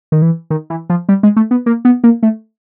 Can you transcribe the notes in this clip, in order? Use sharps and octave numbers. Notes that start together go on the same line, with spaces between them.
D#3
E3
D#3
E3
F3
G3
G#3
A3
B3
A#3
B3
A#3
A3